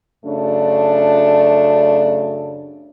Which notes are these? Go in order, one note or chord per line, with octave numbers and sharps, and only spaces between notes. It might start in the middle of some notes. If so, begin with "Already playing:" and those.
F#2 C#3 A3 D4